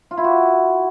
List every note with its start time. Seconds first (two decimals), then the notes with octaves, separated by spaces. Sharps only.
0.11 F4
0.18 E4
0.24 F#4